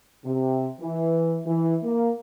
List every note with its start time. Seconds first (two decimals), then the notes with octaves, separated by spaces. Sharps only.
0.24 C3
0.79 E3
1.46 E3
1.83 A#3